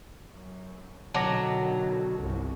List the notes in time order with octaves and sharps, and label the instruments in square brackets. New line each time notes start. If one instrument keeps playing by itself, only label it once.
[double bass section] F#2
[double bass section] B2 D3 D#3 [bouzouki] F#3 [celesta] A5 D6 A#6
[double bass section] G1 C2